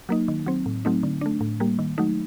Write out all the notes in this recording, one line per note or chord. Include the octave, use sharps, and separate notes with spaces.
F#3 A#3 D#4
D#3
F#3 C4
A2
F#3 A3 C4 D#4
D3
A3 D4
A2
G3 A#3
D#3
F#3 A3 D#4